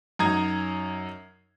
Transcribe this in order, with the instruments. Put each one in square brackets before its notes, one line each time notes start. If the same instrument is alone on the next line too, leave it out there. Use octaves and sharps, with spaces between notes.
[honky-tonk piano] F#2 D#4 A#5 G#6